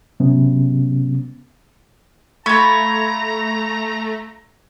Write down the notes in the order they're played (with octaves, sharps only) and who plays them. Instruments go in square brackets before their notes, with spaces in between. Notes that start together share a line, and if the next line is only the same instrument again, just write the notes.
[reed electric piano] G#2 C3 F#3 B3 C#4
[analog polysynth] A3 [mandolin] F4 B5 [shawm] A#5 [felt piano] C#6 G#6